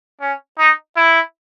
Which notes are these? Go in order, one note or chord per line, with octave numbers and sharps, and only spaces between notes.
C#4
D#4
E4